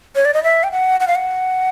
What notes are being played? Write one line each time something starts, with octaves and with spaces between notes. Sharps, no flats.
C#5
D5
D#5
E5
G5
F#5
F#5
F5
F#5